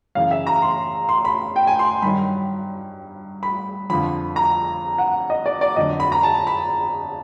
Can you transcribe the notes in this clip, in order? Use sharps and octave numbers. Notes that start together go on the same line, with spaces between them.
F#2 C#3 E3 F5
E5
A#5
C6
C6
B5
G5
G#5
C6
G2 D#3 F#3 B5
B5
F2 D3 F3 B5
A#5
F#5
D#5
D5
D5
F2 D3 F#3 D#5
B5
A#5
A5
B5